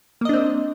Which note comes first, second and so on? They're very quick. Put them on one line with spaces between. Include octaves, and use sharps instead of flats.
A#3 D#5 D4 C4